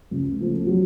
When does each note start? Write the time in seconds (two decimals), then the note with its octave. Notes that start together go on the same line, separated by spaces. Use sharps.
0.11 C#2
0.40 C#3 F3 A3
0.67 F#3